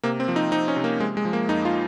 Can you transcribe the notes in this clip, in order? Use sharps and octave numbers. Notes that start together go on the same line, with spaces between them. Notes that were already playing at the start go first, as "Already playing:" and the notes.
C3 A#3
C4
F3
D#4
F3 D#4
C#4
C3
A#3
C3 G#3
G#3
F3
A#3
F2 D#4
F4